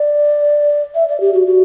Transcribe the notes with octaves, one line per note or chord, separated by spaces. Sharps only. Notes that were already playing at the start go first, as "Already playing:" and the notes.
Already playing: D5
E5
D5
G4
F#4
F#4